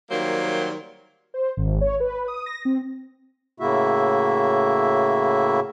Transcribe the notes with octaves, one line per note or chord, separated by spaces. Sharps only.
D#3 F#3 G3 A#3 C5
C5
G#1
C#5
B4
D#6
A#6
C4
A2 C#3 A#3 E4 F#4 E5